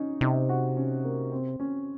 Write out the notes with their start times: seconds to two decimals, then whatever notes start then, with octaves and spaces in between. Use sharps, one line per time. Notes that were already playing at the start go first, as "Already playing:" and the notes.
Already playing: C#4 D#4
0.21 C3 D#4
0.49 F#4
0.77 C#4
1.05 A#3
1.32 C4
1.60 C#4